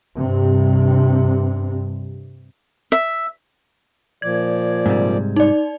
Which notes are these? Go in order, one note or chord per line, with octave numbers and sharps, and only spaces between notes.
G2 C3
E5
A#2 F3 D5 G#6
G#2 C3 G3
D#4 D5